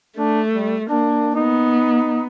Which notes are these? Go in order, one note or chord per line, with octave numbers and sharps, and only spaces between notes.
A3 D4
G3
A#3 D4
B3 D#4